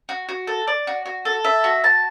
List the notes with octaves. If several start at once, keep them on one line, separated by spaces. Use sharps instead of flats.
F#4
F#4
A4
D5
F#4
F#4
A4
E5
F#4
A5